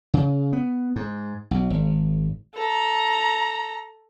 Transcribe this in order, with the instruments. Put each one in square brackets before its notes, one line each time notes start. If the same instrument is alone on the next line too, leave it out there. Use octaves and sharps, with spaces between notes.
[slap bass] C#3
B3
G#2
B1
G#1
[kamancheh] A4 A#5